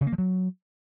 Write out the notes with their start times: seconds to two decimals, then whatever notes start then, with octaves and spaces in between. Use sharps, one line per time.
0.01 C#3
0.07 A#3
0.13 F3
0.18 F#3